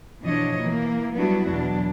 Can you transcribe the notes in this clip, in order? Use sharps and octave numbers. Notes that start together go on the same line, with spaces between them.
B2 E3 F3 D4 C#5 D#5
E3 A#3
F#3 G3 B3 D4 E4 F#4
E2 B2 F#3 D4